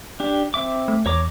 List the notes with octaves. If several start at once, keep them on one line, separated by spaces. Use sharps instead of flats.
D4 G4
C4 E5 D6
A3
E2 C#5 A#5 D6